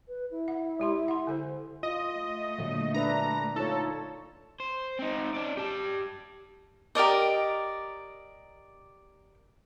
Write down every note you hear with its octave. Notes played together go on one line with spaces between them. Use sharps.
B4
E4
F#5
G#3 G4 C6
F#5 C6
D3 A4 C5
F4 D#5
A3
A#2 D3 F#3
D4 B4 E5 A#5
D#4 F4 A4 C#5
C5
C4 D#4
C#4 D5
G4 A5
G4 A#4 D5 D#5